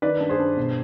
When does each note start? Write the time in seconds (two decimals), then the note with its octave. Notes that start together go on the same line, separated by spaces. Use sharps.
0.02 D#3 B4 D5
0.20 G2
0.29 G#4 C5
0.39 G2
0.56 B2